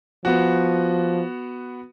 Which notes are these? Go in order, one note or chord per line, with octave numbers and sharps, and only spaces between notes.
F3 B3 F#4